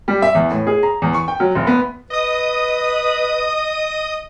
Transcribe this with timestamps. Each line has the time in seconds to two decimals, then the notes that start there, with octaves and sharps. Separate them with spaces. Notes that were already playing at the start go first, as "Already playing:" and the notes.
0.08 G3
0.22 E5
0.35 E2
0.50 A2
0.67 G#4
0.83 A#5
1.02 E2
1.14 C#6
1.28 G5
1.40 F#3
1.55 F1
1.67 B3
2.10 B4 D#5 D#6